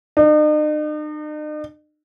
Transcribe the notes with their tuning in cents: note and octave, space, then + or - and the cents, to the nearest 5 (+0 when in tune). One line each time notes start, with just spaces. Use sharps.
D#4 -45